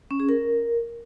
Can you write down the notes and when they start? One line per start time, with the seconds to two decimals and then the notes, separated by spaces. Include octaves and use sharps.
0.11 C#4
0.20 G#4
0.29 A#4